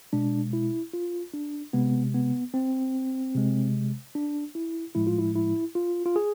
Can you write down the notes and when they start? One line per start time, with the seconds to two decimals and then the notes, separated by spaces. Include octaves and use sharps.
0.13 B2 G#3 D4
0.53 E4
0.93 F4
1.33 D4
1.73 C3 G#3 B3
2.14 B3
2.54 C4
3.35 C3 G#3
4.15 D4
4.55 E4
4.95 A2 F3 G#3 E4
5.07 F4
5.18 E4
5.35 E4
5.75 F4
6.06 F4
6.16 G#4